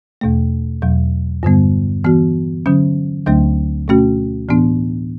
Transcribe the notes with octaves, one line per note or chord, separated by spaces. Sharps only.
E2 B2 A3
E2 B2 F#3
G2 D3 G3 B3
E3 B3 F#4
D3 F#3 C#4
D2 D3 F#3 A3 D4
B2 A3 C#4 F#4
A2 E3 B3 D4